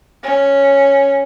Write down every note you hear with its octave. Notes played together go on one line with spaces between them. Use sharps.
C#4